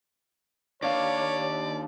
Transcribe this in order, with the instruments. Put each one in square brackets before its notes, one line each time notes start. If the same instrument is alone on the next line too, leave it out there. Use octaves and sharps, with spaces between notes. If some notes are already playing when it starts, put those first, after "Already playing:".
[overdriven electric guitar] D#2 F5 [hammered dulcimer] D4 F4 [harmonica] C#5 [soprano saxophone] D5